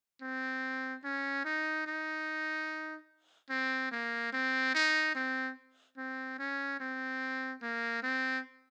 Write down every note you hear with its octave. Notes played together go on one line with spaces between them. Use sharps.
C4
C#4
D#4
D#4
C4
A#3
C4
D#4
C4
C4
C#4
C4
A#3
C4